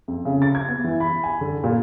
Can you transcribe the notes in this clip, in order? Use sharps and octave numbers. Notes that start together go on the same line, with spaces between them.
F2
C#3
A6
G#6
B3
E3
B5
G#5
D3
A#2